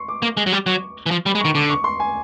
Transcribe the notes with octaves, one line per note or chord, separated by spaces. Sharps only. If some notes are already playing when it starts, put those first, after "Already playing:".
Already playing: C6 C#6
D6
A#3
G#3
F#3
G3
F#3 C#6
E3
F3
G3 B5
G#3
D#3 C#6
D3 D6
C#6
C6
G#5